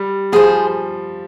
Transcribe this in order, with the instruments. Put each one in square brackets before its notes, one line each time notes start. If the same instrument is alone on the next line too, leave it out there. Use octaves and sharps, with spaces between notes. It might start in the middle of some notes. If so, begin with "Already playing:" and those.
Already playing: [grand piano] G3
[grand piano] F3 [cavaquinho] G#4 C5